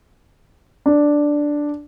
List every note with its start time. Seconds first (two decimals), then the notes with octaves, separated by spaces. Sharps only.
0.86 D4